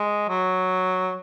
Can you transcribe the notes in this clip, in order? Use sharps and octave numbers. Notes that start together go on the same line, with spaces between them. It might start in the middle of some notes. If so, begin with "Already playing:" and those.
Already playing: G#3
F#3